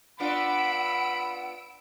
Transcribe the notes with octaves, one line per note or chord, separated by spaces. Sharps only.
B3 D4 F4 F#5 B5 E6 D7